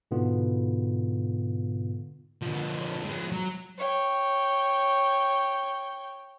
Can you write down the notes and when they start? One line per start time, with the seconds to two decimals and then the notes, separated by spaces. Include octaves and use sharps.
0.11 G#2 B2 D3 B3 F4
2.42 D3 F3
3.04 F3 G#3
3.32 F#3
3.78 C#5 G5